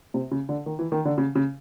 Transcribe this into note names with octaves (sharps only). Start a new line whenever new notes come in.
C3
C#3
D3
D#3
E3
D#3
D3
C#3
C#3